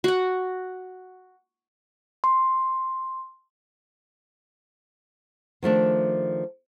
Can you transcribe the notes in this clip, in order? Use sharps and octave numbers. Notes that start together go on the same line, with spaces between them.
F#4 F#5
C6
D#3 F3 A3 D4